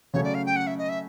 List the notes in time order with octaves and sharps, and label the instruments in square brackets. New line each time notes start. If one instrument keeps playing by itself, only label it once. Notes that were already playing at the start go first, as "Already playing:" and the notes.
[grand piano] C#3 F#3 A3 C#4 [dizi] C#5
[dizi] D5
F5
G5
F#5
E5
D#5
E5